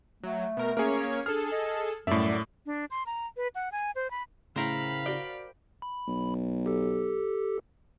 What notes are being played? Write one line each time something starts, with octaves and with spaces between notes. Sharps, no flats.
F#3 A3
B2 A#4
A#3 C#4 G#4 A#4 C#5
D4 G#4 A4 F6
D#5
F#2 A2 G3 A3 D5 E5
D4
C6
A#5
B4
F#5
G#5
C5
B5
A2 C#3 E4 A#4 C5 F5 B5
F#4 D5 G5
B5
B1
G4 A4